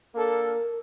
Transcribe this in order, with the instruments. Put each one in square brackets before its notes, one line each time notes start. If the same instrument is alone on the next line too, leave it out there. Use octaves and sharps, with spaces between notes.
[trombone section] A#3 D4 A4 [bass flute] A#4